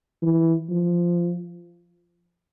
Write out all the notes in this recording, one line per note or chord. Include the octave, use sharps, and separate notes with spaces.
E3
F3